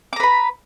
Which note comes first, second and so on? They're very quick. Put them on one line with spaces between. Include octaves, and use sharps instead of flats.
D6 A#5 B4 B5